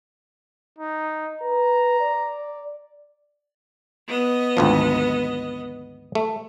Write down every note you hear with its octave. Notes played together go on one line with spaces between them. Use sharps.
D#4
B4 A#5
D5
B3 D#5
G#1 D2 F3
A3